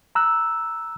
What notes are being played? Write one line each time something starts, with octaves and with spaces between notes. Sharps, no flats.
A#5 E6 F#6